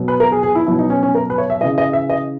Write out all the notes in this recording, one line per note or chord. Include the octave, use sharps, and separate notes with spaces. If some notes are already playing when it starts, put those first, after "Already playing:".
Already playing: B2 F#3
B4
A#4
G#4
G#4
E4
B2 F#3 E4
D#4
C#4
C#4
A#4
B4
C#5
E5
C#3 E3 D#5
D#5
E5
D#5